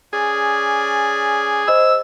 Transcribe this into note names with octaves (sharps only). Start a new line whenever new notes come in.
C#4 G#4 D5
C5 D#5 B5 E6